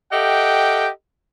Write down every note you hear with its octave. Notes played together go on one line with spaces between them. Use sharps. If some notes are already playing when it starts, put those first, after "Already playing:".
G4 A4 D#5 E5 F#5 G5